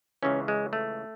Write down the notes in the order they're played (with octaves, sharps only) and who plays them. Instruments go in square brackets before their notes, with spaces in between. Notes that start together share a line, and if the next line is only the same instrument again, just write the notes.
[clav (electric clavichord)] C#2 C#3 E3 C#4
G#3
A3